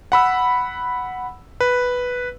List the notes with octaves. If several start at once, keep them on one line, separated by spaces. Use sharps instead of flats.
F#5 B5 E6
B4